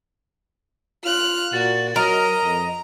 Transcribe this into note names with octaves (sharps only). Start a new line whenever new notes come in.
F4 F6 F#6
A#2 F#4 A6
F#3 A#4 D#5 A#5
F2